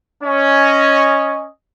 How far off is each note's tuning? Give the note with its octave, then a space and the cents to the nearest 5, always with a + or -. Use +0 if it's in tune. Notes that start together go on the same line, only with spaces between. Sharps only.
C#4 +0 D#5 +0